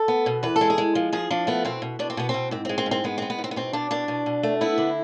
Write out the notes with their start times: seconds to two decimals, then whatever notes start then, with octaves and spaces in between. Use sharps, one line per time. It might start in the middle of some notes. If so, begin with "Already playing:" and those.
Already playing: A4
0.08 B3
0.26 B2
0.43 E2 B4
0.56 A4
0.61 G#3
0.70 G#4
0.78 G#3
0.95 F3
1.13 F3 G#4
1.30 F3 D4
1.47 A3 B3
1.65 B2 C4
1.82 B2
1.99 B2 D4
2.10 C4
2.17 B2 B3
2.29 C4
2.34 B2
2.51 G#2 C4
2.65 C4
2.69 G#3
2.78 C4
2.86 G#2
2.91 C4
3.04 G#3 B3
3.18 B3 C4
3.30 B3
3.38 G#2
3.44 C4
3.51 B3
3.56 B2 C4
3.73 B2 D4
3.91 B2 D4
4.08 B2
4.26 B2
4.43 A3
4.61 B3 E4
4.78 D3